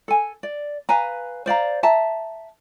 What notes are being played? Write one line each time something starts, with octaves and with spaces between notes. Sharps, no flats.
A4 G#5
D5
B4 F5 G#5 A#5
C5 D5 F5 A#5
E5 A5 A#5